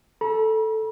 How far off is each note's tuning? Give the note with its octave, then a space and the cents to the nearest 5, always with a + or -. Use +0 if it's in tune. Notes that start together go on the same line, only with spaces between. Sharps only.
A4 +0 B5 -45